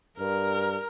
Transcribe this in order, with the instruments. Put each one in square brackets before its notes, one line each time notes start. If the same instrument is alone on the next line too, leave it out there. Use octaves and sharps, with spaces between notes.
[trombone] G2 [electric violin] A#4